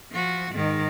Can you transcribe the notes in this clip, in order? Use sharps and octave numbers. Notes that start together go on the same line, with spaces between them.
F3 F#4
G#2 D#3